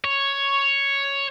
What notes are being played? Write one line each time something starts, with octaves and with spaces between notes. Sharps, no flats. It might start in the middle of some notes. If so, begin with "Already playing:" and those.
C#5